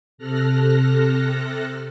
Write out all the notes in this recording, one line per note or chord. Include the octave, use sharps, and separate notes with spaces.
C3 A4 F6 F#6 A#6